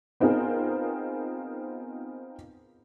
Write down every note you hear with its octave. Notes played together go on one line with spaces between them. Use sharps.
B3 C4 D#4 F4 G#4 A#4